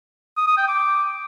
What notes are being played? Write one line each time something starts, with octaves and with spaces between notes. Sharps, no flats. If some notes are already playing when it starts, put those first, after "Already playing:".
D#6
D#6
G5
D6